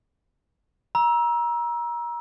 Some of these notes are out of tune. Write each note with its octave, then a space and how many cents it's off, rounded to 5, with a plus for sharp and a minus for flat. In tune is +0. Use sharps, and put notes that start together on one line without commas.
A#5 +30 E6 -5